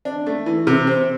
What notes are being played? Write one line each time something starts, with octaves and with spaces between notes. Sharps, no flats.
D4
A3
E3
C3
C4